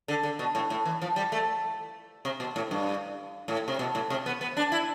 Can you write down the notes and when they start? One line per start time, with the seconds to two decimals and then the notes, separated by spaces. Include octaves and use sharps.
0.08 D3
0.23 D3
0.39 B2
0.55 A2
0.70 A2
0.85 E3
1.02 F3
1.16 G3
1.32 A3
2.25 C3
2.40 B2
2.56 A2
2.71 G2
3.48 A2
3.68 C3
3.79 B2
3.95 A2
4.10 C3
4.26 B3
4.41 B3
4.57 D4
4.72 E4